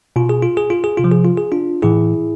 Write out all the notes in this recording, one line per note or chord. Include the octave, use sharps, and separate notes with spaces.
B2 F4
G#4
F4
G#4
F4
G#4
C3 F4
F3
G#4
F4
G#4
D4 F4
A2 E3 E4 G#4